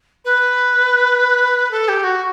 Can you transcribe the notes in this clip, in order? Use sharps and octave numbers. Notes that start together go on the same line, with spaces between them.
B4
A4
G4
F#4